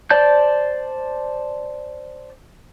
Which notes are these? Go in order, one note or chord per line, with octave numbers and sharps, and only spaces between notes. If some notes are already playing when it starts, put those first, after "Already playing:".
C5 D5 A5 G6